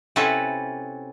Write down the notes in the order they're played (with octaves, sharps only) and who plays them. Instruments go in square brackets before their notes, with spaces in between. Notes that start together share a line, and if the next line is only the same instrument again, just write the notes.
[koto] C3 C#4 E4 F#4 A4 B4